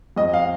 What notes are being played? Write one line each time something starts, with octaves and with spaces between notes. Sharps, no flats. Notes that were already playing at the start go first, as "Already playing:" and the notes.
F2 D#5
F5